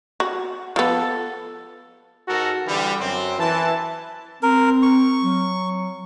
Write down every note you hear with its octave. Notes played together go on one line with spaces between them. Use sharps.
F#4
F3 B3 A4
G#2 F#4 A4 A#4
D3 E3 G3
F#2 C4
E3 A5
C4 A#4
C#6
F#3